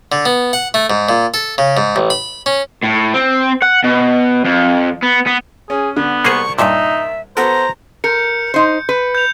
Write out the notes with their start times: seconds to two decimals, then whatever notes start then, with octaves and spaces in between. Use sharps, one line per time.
0.12 D3
0.26 B3
0.53 F#5
0.74 A3
0.90 G#2
1.09 A#2
1.34 A4
1.58 C#3
1.77 G#2
1.96 A1
2.10 B5
2.46 C#4
2.83 A2
3.14 C4
3.62 F#5
3.84 B2
4.45 F2
5.03 B3
5.27 B3
5.70 C#4 G#4
5.97 D3 B3
6.24 C2 A#3 G#4 C5 C#6
6.59 G2 A#2 D#4 E5
7.37 B3 F#4 A4 C5 A#5
8.04 A#4 G6 C#7
8.54 D#4 C5
8.89 B4
9.15 G6 F7